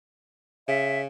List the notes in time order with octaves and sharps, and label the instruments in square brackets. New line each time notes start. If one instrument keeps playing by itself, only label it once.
[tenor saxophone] C#3 [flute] E5